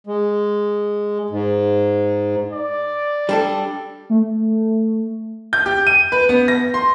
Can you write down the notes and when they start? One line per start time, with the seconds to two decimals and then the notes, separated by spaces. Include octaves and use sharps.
0.07 G#3
1.30 G#2
2.53 D5
3.29 G3 D4 A4
4.10 A3
5.53 G6
5.66 G4
5.87 D#7
6.12 B4
6.29 B3
6.48 A#6
6.74 C6